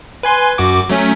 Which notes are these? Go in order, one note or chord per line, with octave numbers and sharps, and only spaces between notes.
B4 G#5 C6
F#2 F#4 D6
F#3 A3 C#4